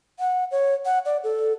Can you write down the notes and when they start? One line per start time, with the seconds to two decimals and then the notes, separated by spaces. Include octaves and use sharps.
0.19 F#5
0.51 C#5
0.86 F#5
1.06 D5
1.24 A4